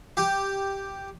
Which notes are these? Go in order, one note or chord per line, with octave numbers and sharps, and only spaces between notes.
G4